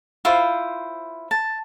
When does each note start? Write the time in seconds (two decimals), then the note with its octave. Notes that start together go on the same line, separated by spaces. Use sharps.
0.25 E4 F4 C5
1.31 A5